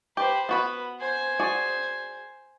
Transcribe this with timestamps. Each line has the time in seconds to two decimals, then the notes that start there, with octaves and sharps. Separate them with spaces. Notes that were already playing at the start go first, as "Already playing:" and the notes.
0.17 G4 B4 C5
0.49 B3 F#4 B4 B5
1.00 C5 G#5
1.39 F#4 G#4 D5